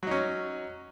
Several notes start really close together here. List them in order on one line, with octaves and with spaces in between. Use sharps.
F#3 D#4 C#4